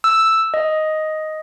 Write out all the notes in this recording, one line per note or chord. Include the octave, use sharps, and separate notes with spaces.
E6
D#5